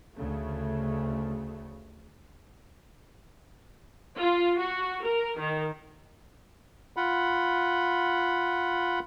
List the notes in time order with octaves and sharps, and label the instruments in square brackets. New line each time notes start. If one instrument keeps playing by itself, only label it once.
[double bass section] D2 C#3 A3
[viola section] F4
F#4
A#4
D#3
[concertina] F4 F#5 B5